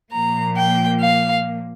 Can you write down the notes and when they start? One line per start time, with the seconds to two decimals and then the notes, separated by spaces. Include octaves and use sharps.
0.12 A#2 F3 A#3 A#5
0.56 G5
1.01 F5